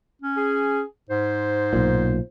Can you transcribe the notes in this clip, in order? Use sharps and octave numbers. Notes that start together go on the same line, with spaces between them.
C#4
G#4
G#2 C5
B1 A#2